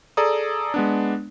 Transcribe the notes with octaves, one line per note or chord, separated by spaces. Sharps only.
G#4 A4 D5 A#5 D#6
G#3 B3 D4